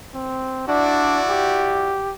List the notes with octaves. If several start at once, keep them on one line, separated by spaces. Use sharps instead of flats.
C4
D4 E4 F#4 D5
G4